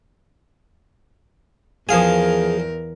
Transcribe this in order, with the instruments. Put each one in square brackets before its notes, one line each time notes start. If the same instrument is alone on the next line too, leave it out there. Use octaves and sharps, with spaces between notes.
[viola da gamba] E2 A#4 [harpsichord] F3 F5 G#5 [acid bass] G#4